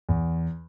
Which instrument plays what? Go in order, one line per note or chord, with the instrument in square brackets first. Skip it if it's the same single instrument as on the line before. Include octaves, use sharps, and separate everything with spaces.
[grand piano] E2